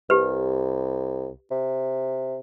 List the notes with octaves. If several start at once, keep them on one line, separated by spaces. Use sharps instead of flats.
C2 G4 B4
C3